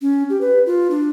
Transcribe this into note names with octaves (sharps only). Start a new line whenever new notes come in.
C#4
G4
B4
F4
D4